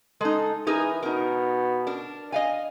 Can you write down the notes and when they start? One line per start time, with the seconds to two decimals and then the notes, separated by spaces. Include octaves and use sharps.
0.21 G#3 D#4 A4
0.67 E3 D#4 G#4 A#4
1.02 B2 D#4 A#4
1.87 D4 A#4
2.32 D#5 F5 G#5